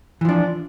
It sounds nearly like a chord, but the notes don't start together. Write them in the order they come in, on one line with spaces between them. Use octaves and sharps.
E3 F3 D4